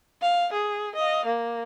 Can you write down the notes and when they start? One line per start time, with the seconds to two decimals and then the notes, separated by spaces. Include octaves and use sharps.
0.22 F5
0.53 G#4
0.95 D#5 F5
1.25 A#3